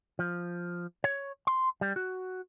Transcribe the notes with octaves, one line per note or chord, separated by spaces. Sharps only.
F3
C#5
C6
G3
F#4